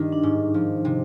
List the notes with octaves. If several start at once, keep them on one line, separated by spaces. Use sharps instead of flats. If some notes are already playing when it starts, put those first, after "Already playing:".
Already playing: G2 D#3 G3 D4 D#4
D4
G#2 D#4
F3
C3